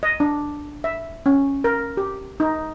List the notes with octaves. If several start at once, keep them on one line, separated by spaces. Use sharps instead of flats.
D#5
D4
E5
C#4
A#4
G4
D#4